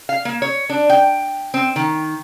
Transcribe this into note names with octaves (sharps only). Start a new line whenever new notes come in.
F5
A#3
C#5
D4
G5
C4
D#3